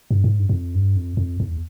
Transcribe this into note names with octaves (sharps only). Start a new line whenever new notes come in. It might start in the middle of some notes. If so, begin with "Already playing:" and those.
G2
G#2
G2
G2
F2
G2
F2
F2
E2